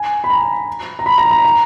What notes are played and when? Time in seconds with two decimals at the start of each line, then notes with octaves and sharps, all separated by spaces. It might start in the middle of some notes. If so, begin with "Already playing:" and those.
Already playing: G#5
0.24 B5
0.30 A#5
0.99 A#5
1.06 B5
1.18 A#5
1.31 A#5
1.44 A#5